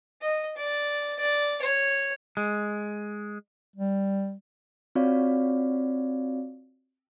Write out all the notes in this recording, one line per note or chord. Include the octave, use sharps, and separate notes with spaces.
D#5
D5
D5
C#5
G#3
G3
C4 F4 F#4 C#5 D5 F5